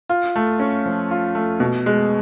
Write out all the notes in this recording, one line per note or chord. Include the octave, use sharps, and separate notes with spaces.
F4
A3
C#4
F3
F4
A3
B2
G#3